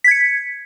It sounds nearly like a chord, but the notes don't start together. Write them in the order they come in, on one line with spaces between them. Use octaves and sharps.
B6 G#6 C#7